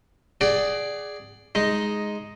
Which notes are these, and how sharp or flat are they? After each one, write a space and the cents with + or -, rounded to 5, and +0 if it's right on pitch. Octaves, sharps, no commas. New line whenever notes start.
G#4 +0 D5 +0 F#5 +40
G#3 +0 D#4 +0